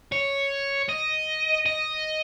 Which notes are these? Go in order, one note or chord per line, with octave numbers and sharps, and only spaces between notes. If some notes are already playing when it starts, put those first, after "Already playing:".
C#5
D#5
D#5